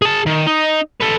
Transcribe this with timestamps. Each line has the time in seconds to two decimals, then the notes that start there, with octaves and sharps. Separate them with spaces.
0.02 G#4 A5
0.26 D#3
0.47 D#4
1.01 A4 B4